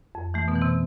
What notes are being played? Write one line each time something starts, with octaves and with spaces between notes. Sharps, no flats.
F2
E3 A3
B2 B3
E3
C3 C4